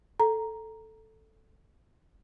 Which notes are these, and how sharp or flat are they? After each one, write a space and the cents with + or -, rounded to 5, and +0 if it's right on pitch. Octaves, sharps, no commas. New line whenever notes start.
A4 +0 A#5 +0